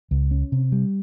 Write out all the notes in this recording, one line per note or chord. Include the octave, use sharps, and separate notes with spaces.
C#2
C#4
C3
G3